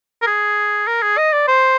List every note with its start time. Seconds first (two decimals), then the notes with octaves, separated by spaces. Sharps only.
0.22 A#4
0.27 G#4
0.87 A#4
1.02 G#4
1.18 D#5
1.33 D5
1.48 C5